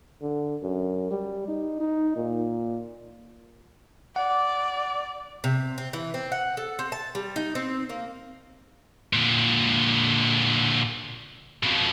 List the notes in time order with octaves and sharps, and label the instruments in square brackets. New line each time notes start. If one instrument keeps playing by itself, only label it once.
[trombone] D3
F#2
G3
D#4
D#4
A#2
[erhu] D5 [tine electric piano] F#5
[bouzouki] C3
C4
E3
C4
F#5
A4
C4
A5
G3
D#4
C4
A#3
[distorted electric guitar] A#2 D3
F2 B2